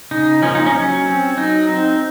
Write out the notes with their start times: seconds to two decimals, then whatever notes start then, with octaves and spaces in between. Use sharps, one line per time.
0.11 C#3 D#4
0.42 F3 A#3 C#4
0.55 D#4
0.66 C#4
0.74 F#3
1.06 C4
1.37 F#3 D#4
1.69 C4